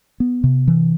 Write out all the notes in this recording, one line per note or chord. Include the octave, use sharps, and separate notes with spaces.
B3
C3
E3